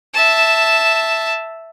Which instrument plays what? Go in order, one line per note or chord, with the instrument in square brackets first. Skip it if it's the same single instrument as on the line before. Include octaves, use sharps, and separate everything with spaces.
[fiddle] E5 A5